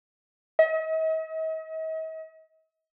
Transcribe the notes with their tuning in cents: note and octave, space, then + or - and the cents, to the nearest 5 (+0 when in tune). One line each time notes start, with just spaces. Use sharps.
D#5 +45